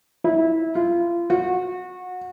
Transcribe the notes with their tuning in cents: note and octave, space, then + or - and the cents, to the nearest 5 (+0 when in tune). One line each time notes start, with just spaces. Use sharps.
E4 -20
F4 -30
F#4 -25